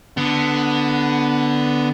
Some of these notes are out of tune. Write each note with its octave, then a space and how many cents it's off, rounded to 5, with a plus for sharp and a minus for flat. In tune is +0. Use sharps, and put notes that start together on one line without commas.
D3 +0 B3 +10